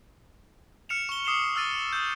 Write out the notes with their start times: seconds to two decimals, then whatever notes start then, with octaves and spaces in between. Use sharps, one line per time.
0.89 F6 C#7 E7 F7
1.09 C#6 G7
1.25 D6 D#6 C7 E7 F7 G7
1.56 E6 F6 A6 D#7
1.93 D#6 G6